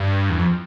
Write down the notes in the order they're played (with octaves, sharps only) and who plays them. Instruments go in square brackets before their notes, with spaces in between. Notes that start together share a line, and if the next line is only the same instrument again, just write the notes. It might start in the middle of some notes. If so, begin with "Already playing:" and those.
Already playing: [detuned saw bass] G2
E2
F2